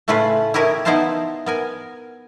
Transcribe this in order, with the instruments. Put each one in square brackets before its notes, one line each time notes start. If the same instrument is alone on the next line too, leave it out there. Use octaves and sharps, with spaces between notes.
[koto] A2 C#3 A3 C#4 F4 B4
E4 G4 A#4 C#5 D#5
B3 D#4 E4 C5 F5 A5
B3 A#4 G#5